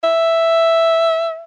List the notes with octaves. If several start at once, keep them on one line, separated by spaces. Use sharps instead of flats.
E5